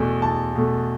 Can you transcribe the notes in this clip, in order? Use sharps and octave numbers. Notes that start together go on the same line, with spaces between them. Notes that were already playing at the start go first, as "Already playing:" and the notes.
Already playing: E2 B2 A3
E2 A5
B2 A3